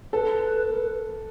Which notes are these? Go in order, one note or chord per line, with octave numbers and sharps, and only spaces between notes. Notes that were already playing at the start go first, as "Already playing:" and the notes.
A4 B4
A#4
B4